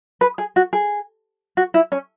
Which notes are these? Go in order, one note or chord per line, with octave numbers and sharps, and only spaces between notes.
B4
G#4
F#4
G#4
F#4
E4
C#4